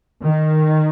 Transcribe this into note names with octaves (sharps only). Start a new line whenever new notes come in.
D#3